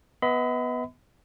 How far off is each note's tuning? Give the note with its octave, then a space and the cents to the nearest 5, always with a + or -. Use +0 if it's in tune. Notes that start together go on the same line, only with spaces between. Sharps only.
B3 +0 D#5 +45 B5 +35